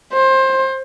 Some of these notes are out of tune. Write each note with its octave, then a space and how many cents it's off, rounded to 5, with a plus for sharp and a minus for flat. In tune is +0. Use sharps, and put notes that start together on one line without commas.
C5 +20